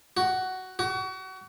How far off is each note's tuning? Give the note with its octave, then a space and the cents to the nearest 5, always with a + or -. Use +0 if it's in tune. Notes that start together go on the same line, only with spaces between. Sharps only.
F#4 +10
F#4 +30